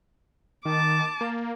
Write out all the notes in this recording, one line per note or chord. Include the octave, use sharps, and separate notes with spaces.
D#3 A5 D6
A#3